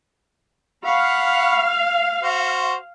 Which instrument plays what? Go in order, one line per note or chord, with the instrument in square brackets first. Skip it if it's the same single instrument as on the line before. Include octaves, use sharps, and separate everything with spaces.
[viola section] F5 [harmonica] F#5 B5 C#6
[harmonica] F#4 C5